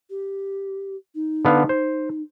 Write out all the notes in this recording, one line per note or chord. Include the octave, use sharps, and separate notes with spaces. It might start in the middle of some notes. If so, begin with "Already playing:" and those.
G4
D#4
D3 B3 F5
C5